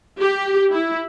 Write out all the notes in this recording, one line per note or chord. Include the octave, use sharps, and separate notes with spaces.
G4
E4